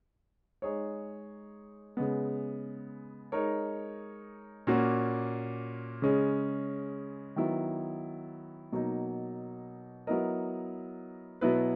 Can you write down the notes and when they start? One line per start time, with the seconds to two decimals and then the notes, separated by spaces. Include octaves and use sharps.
0.62 G#3 D#4 G#4 C#5
1.97 C#3 G#3 B3
3.32 G#3 D#4 A#4 C#5
4.67 A#2 A#3 C#4 F#4
6.02 C#3 G#3 C#4
7.36 D#3 F#3 B3 E4
8.72 B2 F#3 A#3 D#4
10.07 F#3 B3 E4 A#4 D#5
11.41 B2 F#3 B3 E4 B4